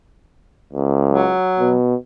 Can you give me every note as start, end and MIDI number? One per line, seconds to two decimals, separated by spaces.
0.73 1.33 37
1.12 1.73 54
1.59 1.95 47